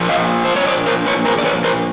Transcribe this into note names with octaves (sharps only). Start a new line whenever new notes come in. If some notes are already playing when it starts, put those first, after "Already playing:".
Already playing: A#2 F3
D#5 F5
C5
C#5
C5 D5
A#4 C5
B4 C#5
A#4 C5
D5
B4 C#5
A#4 C5